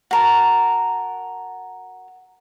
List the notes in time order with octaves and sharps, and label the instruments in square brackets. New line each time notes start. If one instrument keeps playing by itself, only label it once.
[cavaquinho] F#4 A#4 A5